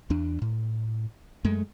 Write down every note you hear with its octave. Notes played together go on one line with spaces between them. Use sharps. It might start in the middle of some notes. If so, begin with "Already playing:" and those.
E2 D4
A2
F#2 G#3 A3